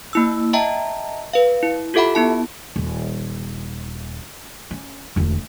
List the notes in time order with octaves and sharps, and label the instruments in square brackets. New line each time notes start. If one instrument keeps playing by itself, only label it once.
[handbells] A#3 E4 E6
D#5 E5 G5 A5 A#5
B4 F5
E4
F4 G4 A4 E5 F#5 B5
B3 E4 A5
[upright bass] D#1
C#4
E1 D2